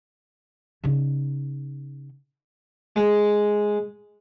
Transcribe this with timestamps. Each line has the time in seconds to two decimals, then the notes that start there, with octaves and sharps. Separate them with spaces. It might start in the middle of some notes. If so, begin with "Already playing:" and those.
0.84 C#3 D#4
2.96 G#3